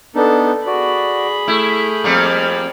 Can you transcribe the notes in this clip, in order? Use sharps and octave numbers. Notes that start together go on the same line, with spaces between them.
B3 D4 D#4 A4
F#4 G#4 D5 B5
A3 E4 F6 G6
F2 G3 A#3